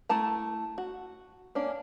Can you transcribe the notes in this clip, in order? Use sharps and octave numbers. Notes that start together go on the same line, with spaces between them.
A3 E4 A5 A#5
F#4
A#3 C#4 D4